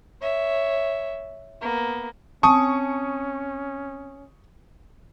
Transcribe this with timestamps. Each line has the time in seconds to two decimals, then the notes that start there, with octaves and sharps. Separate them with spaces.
0.21 C#5 E5
1.61 A#3 B3
2.43 C4 C#4 G#5 A5 C#6 D#6